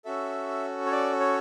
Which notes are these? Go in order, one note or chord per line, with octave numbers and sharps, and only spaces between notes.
C#4 F#4 A4 E5
C#5
D5
C#5